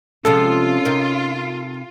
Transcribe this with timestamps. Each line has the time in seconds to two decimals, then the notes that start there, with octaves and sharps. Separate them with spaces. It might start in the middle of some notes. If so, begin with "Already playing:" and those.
0.25 C3 F3 G#3 C#4 F4 A4
0.85 C3 D#4 A#4